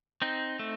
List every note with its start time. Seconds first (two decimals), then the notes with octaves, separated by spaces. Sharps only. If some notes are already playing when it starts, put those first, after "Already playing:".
0.22 C4 D#4
0.59 A3